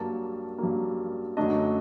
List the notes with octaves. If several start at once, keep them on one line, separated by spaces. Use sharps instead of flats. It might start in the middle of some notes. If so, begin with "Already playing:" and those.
Already playing: G2 F#3 A#3 A5
G2 F#3 A#3
F#2 D3 F#3 A3 D4 D#5